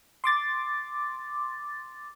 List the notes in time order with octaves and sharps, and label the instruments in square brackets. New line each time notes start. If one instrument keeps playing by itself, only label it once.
[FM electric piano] C6 D6 A6